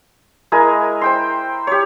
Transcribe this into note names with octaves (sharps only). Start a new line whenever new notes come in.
G#3 E4 A#4 G#5
C5 G5 C6
G4 C#5